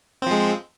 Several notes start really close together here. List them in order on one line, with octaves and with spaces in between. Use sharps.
C4 F3 G#3